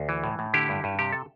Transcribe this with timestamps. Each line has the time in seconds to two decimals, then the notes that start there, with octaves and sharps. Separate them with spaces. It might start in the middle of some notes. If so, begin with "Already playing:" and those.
Already playing: D2
0.09 E3
0.24 A2
0.39 A2
0.54 D3 E4 G4
0.69 G2
0.84 G2
0.99 C3 G4
1.12 A4